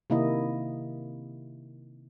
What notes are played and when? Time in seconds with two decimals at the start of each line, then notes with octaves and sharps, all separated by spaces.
0.10 C3 D#3 A#3 E4 D#5